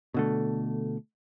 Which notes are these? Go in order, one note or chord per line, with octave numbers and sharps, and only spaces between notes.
B2 D3 A3